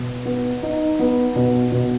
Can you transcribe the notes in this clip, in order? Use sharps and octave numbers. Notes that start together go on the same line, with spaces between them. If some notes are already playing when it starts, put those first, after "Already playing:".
Already playing: B2
B3
D#4
B3
B2
B2